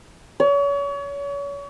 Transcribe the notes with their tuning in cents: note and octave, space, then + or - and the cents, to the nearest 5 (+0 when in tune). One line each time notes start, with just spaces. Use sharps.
C#5 +35